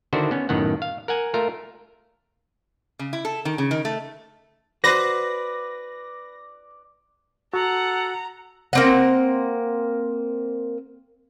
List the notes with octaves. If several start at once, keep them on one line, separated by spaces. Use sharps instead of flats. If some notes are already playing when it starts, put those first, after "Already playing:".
D3 D#3 D4 E4 F#4 C5
B3 C#4
F#2 A2 D#3 B3 F#5
F5
A#4 F#5 G#5
A3 F4 A#4
C#3
E4
A4
D#3
C#3
D#3
A3
F#4 B4 C5 D5 A#6
F#4 A4 F#5 A#5
A#3 C4 F#5